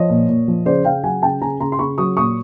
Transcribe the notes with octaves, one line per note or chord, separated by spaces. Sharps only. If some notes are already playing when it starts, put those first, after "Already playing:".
Already playing: F3 C#5 D#5
A#2
A#2
F3
C#3 C5 D5
C#3 F5 G5
F#3 F#5 G#5
C#3 G5 A5
C#3 G#5 A#5
C#3 A#5 C6
C6
C#3 B5 C#6
F#3 C#6 D#6
A#2 C#6 D#6